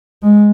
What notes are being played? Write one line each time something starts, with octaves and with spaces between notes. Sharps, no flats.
G#3